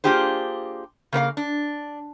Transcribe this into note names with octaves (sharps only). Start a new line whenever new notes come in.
A#3 D4 F4 G4 G#4 C5
C#3 A#3 B4 F5
D4